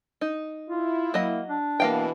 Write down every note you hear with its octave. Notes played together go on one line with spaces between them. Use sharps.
D#4
E4 F4
F#3 A#3 D#5
D4
B2 E3 A#3 F5 G5